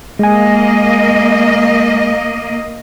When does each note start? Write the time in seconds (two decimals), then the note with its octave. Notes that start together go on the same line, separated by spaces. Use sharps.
0.19 G#3 A#3 D#5 G#5